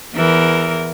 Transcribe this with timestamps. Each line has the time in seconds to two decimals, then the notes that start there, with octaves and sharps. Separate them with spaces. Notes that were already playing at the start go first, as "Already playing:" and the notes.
0.14 E2 E3 A#4